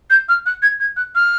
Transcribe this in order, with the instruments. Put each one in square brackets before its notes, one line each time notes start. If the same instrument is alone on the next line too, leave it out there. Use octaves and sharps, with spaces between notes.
[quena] G6
F6
F#6
G#6
G#6
F#6
F6